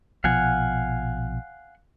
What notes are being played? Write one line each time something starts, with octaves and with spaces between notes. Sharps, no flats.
A#1 B2 F3 F5 F#5 G#5